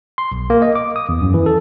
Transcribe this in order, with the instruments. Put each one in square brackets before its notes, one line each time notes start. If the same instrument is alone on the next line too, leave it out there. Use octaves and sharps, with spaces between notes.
[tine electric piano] C6
B1
A#3
D#5
D6
D#6
E2
F#2
E3
A4